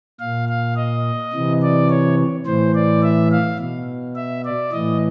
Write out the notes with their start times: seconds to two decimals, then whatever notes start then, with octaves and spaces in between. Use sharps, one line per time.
0.19 A#2 F5
0.48 F5
0.76 D#5
1.33 C3 E3
1.62 D5
1.90 C#5
2.46 A2 E3 C5
2.75 D5
3.03 E5
3.31 F5
3.59 B2
4.16 E5
4.45 D5
4.72 A2 E3 D#5